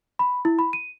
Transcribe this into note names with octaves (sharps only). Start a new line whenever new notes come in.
B5
E4
B5
D#7